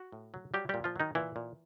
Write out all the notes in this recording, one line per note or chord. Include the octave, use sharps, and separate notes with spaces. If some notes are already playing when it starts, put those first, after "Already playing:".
Already playing: F#4
A2
F#3
F#3 G3 G4
A#2 G3 G4
F3 F4
D#3 F#3 D#4
A#2 E3 E4
A#2